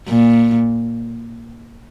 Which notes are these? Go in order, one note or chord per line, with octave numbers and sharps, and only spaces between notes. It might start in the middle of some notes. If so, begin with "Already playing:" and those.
A#2